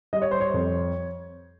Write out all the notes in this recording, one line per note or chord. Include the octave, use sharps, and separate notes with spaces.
G3 D#5
C#5
C5
C#5
F2